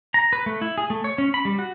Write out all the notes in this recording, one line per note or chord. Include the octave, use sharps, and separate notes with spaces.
A#5
B4
A3
E4
G#4
A3
C#5
C#4
B5
G3
F#4